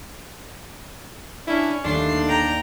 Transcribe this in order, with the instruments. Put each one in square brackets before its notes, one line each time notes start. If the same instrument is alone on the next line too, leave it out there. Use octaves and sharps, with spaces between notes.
[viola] C#4 [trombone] D4 [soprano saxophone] E4
[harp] D#2 [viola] G3 C6 [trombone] A3 [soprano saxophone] D4
[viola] G5 A#5